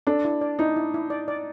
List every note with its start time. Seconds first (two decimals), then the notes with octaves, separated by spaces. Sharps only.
0.07 D4 A4
0.25 E4
0.41 D5
0.59 D#4 E4
0.76 E4
0.94 E4
1.10 D5
1.28 D5